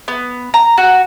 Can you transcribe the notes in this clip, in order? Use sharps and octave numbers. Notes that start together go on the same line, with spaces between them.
B3
A#5
F#4